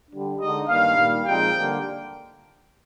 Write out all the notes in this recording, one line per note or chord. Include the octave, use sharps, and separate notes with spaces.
D3 G3 D4
D3 G#3 D#4 D#5
G2 D#3 A#3 F5
A#2 G3 A#3 D#4
A#2 F3 G#3 C4 D#4 G5
D3 G3 A#3